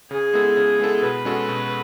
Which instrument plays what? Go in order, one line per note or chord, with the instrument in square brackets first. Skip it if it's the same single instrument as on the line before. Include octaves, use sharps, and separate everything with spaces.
[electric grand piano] C#3 [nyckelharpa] G#4
[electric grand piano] G#3 B3 E4 A4
C#3
G#3 B3 E4 A4
[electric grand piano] B2 [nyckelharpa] B4
[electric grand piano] G#3 C#4 F#4 A4
B2